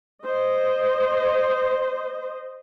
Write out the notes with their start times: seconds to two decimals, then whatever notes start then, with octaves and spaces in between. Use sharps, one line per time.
0.24 C5 D#5